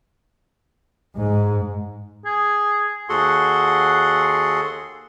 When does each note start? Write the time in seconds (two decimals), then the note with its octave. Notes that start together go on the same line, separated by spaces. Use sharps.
1.16 G#2
2.26 G#4
3.09 D#2 F#4 G#4 A4 F#5 C6